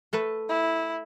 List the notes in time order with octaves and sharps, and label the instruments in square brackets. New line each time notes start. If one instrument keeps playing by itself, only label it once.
[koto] A3 A4 B4
[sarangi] E4